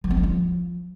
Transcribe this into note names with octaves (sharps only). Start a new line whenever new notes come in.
F3
B3
C#4
F3